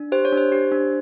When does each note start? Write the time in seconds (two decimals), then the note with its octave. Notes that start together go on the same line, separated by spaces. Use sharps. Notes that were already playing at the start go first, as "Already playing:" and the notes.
Already playing: D4
0.12 G4 C5
0.25 C#5
0.32 D4
0.37 C5
0.52 G4
0.72 D4